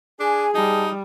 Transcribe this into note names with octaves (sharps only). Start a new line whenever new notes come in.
D4 G#4 G#5
G3 D#4 A5